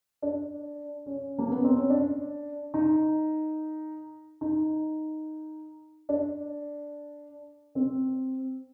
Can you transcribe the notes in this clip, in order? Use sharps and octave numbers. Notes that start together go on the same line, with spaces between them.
D4
C#4
A#3
B3
C4
C#4
D4
D#4
D#4
D4
C4